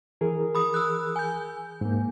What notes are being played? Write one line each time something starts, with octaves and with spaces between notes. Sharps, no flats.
E3 G#4 A#4
B5 D#6
E6 F#6
G#5 G6
G#2 A#3